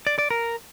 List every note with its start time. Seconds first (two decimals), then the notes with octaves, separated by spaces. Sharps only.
0.07 D5
0.19 D5
0.30 A#4